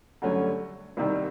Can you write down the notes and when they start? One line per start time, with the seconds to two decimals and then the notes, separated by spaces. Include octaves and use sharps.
0.22 G2 D3 F#3 A3 C#4
0.97 C2 C3 D#3 G3